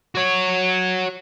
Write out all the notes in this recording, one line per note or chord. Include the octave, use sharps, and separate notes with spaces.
F#4 C#5